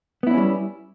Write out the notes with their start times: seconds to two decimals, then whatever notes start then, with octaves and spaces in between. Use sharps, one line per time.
0.23 B3
0.27 E4
0.30 D4
0.34 C#4
0.37 G3